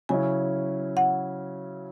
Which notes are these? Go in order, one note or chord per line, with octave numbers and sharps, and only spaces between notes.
C#3 F#3 C#4 E4 G#5
F#5